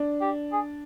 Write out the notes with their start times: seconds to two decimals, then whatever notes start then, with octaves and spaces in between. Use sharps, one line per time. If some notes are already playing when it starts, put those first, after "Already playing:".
Already playing: D4
0.21 G4
0.52 G#4